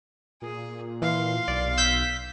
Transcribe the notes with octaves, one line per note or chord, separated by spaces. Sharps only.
A#2 G#4
E3 F5 C6
B1 D5
E6 G6 B6